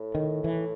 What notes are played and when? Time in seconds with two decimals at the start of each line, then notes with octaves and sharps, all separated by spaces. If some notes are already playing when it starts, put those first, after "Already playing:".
Already playing: A2
0.15 D#3
0.44 E3